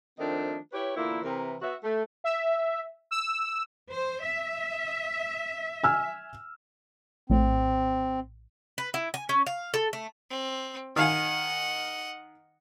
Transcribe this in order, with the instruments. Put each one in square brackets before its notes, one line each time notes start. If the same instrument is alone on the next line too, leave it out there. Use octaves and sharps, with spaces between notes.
[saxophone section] D#3 F3 A3 C4 D4 D#4
E4 G4 B4 C#5
E2 A#2 D3 A#3 E4
C3 E3 A#4
B3 F#4 E5
A3
[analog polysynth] E5
E6
[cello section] C5
E5
[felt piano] G#5 E6 F6
[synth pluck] A#1 A2 [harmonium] C4
[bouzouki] B4
E4
G#5
C#4
F5
A4
A3
[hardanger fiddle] C4
[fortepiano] D#3 F5 G#5 [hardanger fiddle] D#5 F#5